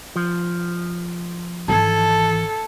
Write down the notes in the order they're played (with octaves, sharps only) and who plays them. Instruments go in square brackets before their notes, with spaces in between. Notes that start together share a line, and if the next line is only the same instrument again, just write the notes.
[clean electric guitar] F3
[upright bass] G#1 E3 [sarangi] A4 [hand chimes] A5 G#6